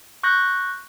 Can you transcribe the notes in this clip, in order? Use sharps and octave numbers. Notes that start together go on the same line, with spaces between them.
C#6 F#6 G6 A#6